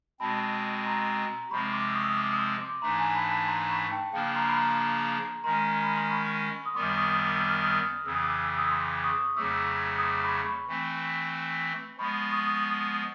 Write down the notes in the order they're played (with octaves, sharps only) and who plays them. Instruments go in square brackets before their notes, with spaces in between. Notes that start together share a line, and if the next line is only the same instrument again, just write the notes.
[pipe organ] B2 G#3 C4 [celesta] A5 B5
[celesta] A#5 C6
[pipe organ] C3 F3 G#3 C4 [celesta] B5 C#6
[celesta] C6 D6
E6
C#6 D#6
D#6
D6 E6
D#6
C6 D6
C6 D6
[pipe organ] G#2 E3 A3 D4 [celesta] A#5 C6
[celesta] G#5 A#5
A5 B5
A5 B5
A#5 C6
B5 C#6
G5 A5
[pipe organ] C#3 F3 A#3 D4 [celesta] F5 G5
[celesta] A#5 C6
B5
A#5 C6
[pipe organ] D#3 G#3 C#4 [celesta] A#5 C6
[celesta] B5
C6
B5 C#6
D#6
[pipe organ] F#2 D#3 G3 B3 [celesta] C6 D6
[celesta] C#6 D#6
D6 E6
F6
E6
D#6 F6
[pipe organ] F2 C#3 E3 [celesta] E6
[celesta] D#6
D6 E6
E6
D#6
C6 D6
C#6 D#6
[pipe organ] F2 C#3 F#3 A3 [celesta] D6 E6
[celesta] D#6
C6 D6
B5 C#6
B5 C#6
[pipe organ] E3 A3 C4
[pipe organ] F3 G#3 B3 [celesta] B5 C#6
[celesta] C#6 D#6